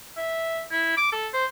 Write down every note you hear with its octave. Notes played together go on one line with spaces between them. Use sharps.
E5
E4
D6
A4
C5